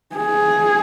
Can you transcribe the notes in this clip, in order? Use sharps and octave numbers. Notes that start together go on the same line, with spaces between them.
G#4